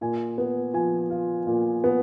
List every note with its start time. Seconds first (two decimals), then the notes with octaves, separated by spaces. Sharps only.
0.01 A#2 G#5
0.38 B3
0.74 F3 G#5
1.10 F4
1.47 A#2
1.84 B3